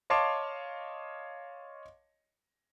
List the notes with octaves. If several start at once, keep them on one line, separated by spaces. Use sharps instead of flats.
C#5 D#5 F5 A5 C6 D6